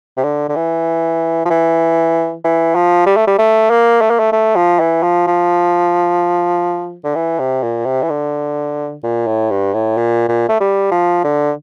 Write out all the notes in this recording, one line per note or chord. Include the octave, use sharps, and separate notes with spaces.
C3
D3
D3
E3
F3
E3
E3
F3
G3
A3
G3
A3
A#3
A3
A#3
A3
A3
F3
E3
F3
F3
D3
E3
C3
A#2
C3
E3
D3
A#2
A2
G2
A2
A#2
A#2
A3
G3
F3
D3